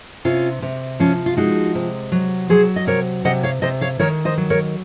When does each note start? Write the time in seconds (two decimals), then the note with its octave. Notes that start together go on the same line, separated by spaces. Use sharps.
0.25 C3 C#4 F4
0.62 C3
1.00 F3 C#4 F4
1.26 F4
1.37 G#3 D#4 F#4
1.75 C3
2.12 F#3
2.50 F#3 G#4 C5
2.76 D#5
2.87 C3 A#4 C#5
3.25 C3 D#5 F#5
3.43 C#5 F5
3.62 C3 C5 D#5
3.81 C#5 F5
3.99 D#3 A#4 C#5
4.25 C5 D#5
4.37 F#3
4.50 A#4 C#5